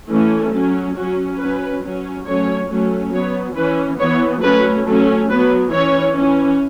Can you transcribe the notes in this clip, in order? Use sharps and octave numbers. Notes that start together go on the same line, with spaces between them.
E3 A3 C#4
F#3 C#4
F#3 C#4 F#4
F#3 C#4 B4
F#3 C#4
F#3 A3 C#4 C#5
F#3 A3 C#4
F#3 B3 C#5
E3 C#4 B4
E3 B3 C#5
F#3 A3 C#4 B4
F#3 A3 C#4 A4
F#3 B3 B4
E3 C#4 C#5
E3 C#4